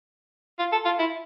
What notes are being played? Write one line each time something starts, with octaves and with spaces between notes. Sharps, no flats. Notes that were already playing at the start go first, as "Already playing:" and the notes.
F4
A4
F4
E4